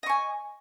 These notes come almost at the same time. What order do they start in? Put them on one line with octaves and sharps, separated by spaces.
D#5 C#6 G#5